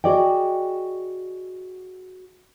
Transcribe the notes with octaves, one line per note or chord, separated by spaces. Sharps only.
F#4 G#4 D5 D#5 G5